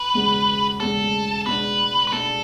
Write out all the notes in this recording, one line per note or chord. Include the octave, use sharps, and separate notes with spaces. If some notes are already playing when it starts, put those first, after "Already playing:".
Already playing: B4
E1 E2 C#3
E1 E2 C#3 A4
B2 G#3 D4 B4
B4
B2 G#3 D4 A4